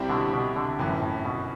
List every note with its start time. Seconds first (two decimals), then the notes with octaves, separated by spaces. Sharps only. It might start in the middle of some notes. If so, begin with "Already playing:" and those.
Already playing: C2 C3 G3 C4 E4
0.10 B2 D3
0.33 B2
0.56 B2 D3
0.79 G1 F#2 A2 C3 E3
1.02 A2
1.25 B2